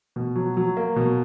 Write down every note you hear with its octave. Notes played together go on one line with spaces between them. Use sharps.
B2
F#3
F#3
A#3
B2